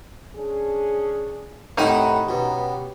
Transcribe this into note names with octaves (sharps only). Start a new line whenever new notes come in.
C#4 D4 G#4
A2 C3 D#3 D#4 F#5 G5 B5
B2 B3 C#4 G4